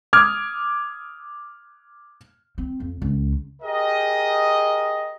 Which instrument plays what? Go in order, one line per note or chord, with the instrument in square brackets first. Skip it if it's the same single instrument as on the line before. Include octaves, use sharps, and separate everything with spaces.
[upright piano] D6 D#6 F6 G#6
[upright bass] C4
F2
C#2
[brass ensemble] G4 G#4 A#4 D#5